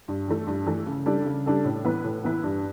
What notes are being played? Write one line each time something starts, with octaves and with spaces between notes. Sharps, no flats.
G2
E3 A3
G2
E3 A3
C#3
G3 D4 A4
C#3
G3 D4 A4
A2
E3 B3 E4 B4
A2
E3 B3 E4 B4
G2